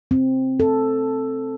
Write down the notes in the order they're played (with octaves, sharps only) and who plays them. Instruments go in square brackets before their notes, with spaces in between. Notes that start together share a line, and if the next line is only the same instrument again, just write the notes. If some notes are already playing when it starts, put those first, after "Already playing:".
[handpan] C4
A4